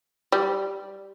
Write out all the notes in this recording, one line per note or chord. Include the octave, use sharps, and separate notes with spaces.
G3